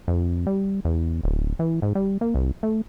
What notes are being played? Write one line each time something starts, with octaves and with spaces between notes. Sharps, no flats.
F2
G3
E2
D1
E3
G#2
G3
A#3
C2
A3